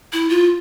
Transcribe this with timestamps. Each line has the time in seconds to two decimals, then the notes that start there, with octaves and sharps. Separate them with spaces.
0.13 E4
0.29 F4